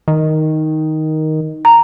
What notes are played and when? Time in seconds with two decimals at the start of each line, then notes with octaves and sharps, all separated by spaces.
0.08 D#3
1.65 A#5